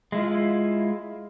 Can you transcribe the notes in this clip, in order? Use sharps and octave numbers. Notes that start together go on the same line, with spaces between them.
G#3 E4 F4